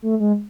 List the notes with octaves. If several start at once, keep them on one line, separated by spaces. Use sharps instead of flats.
A3
G#3